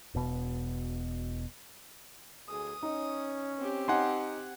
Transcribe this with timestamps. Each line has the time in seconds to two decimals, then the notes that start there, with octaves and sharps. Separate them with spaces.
0.14 E1 B2
2.49 D2 G#4 D#6
2.83 C#4 D#4
3.58 C4 G4
3.88 D#4 F#5 G#5 C6